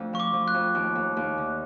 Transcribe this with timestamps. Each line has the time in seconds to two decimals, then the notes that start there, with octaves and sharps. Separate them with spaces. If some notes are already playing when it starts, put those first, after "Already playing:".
Already playing: F2 A3 D4
0.13 F3 C#6
0.20 D6
0.33 F3
0.48 F#6
0.54 F2
0.75 D#2
0.95 D#2
1.16 D#2
1.38 D3